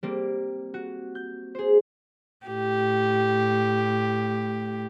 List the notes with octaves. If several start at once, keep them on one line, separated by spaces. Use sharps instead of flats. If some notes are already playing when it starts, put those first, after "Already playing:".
G3 A#3 C4
F#4
G6
G#4 C5
A2 G4